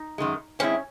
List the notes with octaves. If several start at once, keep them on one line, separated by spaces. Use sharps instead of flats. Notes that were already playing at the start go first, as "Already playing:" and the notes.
Already playing: D#4
F#2 D#3 G#3
D#3 G#3 C4 C#4 E4